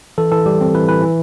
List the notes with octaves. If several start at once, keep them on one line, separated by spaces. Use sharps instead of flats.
E3 A4
E3 A4
G3 G4
C4
E3 B4
E3 B4
E3